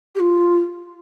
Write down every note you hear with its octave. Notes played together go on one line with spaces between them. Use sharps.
G4
F4